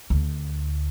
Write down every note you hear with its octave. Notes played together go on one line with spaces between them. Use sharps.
D2